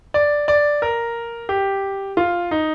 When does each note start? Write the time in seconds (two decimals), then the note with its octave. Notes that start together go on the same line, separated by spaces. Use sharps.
0.14 D5
0.48 D5
0.82 A#4
1.49 G4
2.17 F4
2.51 D#4